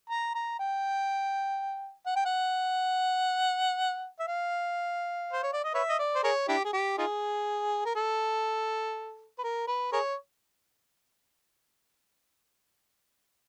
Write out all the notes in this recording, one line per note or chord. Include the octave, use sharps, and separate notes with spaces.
A#5
A#5
G5
F#5
G5
F#5
E5
F5
C5
C#5
D5
D#5
B4 C#5 E5
D#5
D5
C5
G#4 A#4 C#5
D4 E4 G4
G#4
G4
D#4 F4 G#4
A#4
A4
B4
A#4
B4
G#4 A#4 C#5